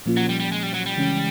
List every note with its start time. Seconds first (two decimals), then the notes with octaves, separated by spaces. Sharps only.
0.06 A#2 F3 A#3 C#4 F4
0.17 F#3
0.29 G3
0.40 G3
0.52 G#3
0.63 G3
0.74 F#3
0.86 G3
0.97 C#3 E3 G#3 C#4